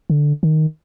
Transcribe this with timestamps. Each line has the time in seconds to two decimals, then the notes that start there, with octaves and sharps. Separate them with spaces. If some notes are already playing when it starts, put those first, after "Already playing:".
0.10 D3
0.43 D#3